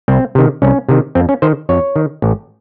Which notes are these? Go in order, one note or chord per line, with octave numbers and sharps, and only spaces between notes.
C2 C4
C3 D#3
C2 C#4
C3 D#3
F2 C4
C#4
D#3 C5
F2 C#5
D#3
A1